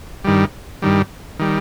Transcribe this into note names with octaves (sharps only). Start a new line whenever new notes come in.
G2 D#3 G3
G2 D#3 G3
D#3 G3